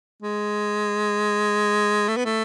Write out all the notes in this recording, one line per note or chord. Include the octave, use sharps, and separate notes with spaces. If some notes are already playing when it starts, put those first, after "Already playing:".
G#3
A3
B3
A3